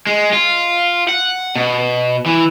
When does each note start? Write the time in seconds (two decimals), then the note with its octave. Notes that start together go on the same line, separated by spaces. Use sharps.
0.07 G#3
0.33 F4
1.09 F#5
1.56 B2
2.26 E3